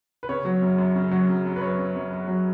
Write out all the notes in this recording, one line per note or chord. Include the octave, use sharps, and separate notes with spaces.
B4
C#3 C#5
F#3
F#2
F#2
C#3
F#3
F#2
F#2
B4
F#2 C#5
F#2
F#2
F#2
F#3